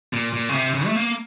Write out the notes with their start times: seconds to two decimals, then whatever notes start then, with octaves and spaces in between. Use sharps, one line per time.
0.13 A#2
0.33 A#2
0.49 C#3
0.54 C3
0.74 C#3
0.86 A3
0.96 A#3